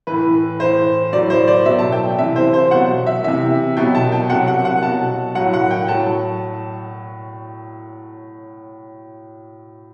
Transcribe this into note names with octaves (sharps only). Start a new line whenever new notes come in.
A2 E3 B4
A2 E3 C5
A2 F#3 D5
C5
D5
B2 F#3 E5
A5
G5
C3 E3 E5
C5
C5
B2 F#3 F#5
E5
C3 E3 E5
B2 F#3 G5
A5
G5
C3 F#3 F#5
F#5
F#5
B2 F#3 A5
A2 F#3 F#5
F#5
G5
A2 F#3 A5